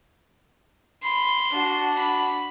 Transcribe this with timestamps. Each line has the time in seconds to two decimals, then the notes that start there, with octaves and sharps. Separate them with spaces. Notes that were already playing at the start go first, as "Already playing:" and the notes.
1.03 B5 C6
1.51 D4 F#4
1.98 B5